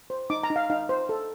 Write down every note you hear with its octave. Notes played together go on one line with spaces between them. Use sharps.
C5
D#4 D6
A#5
D#4
F5
D#4 F5
C5
A4